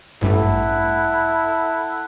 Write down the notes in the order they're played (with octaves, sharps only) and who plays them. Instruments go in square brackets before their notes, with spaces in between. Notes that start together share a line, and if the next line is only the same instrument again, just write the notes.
[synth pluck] A1 G2 A3 [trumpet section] E4 A4 F#5